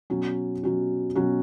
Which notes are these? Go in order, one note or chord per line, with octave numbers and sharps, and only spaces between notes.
B2 F#3 C#4 F#4
B2 F#3 C#4 F#4
B2 F#3 C#4 F#4